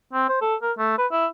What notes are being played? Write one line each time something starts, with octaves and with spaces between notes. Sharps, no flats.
C4
C5
A4
A#4
A3
B4
E4